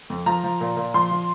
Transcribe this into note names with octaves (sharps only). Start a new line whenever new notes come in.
F2
F3 A#5
F3
A#2
A#2
F3 C6
F3